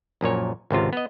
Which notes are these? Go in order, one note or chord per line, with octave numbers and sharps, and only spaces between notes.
A#1 F#2 A#2 C#5
G#1 C#2 C3 F4
B3 D#5